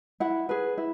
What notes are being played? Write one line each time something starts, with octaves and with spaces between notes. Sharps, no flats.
E4 F#5
G#4 B4
E4